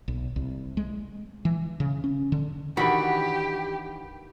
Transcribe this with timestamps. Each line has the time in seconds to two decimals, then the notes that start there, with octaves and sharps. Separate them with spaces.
0.08 B1
0.36 C2
0.77 G#3
1.45 E3
1.80 C#3
2.04 C#4
2.32 D3
2.77 D#3 E3 D4 F#4 G4 B5